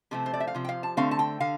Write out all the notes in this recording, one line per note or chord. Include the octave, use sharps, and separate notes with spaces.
C3 F3 A3 C4
C5
D5
E5
F5
C3 F3
G5
F5
A5
D3 A3 C4 F5
A5
G5
D3 F5